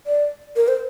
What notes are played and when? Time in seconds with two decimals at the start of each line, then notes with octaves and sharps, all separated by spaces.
0.07 D5
0.56 A#4
0.68 C5